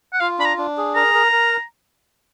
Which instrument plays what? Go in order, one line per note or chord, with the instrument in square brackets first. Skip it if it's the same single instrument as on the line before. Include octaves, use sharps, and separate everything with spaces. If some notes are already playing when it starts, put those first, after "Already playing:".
[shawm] F#5
[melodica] F4 [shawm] F5
[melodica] D4 [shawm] B5
[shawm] A#5
[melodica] D4
G#4
[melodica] A#4 [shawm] A#5
[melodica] A#4
A#4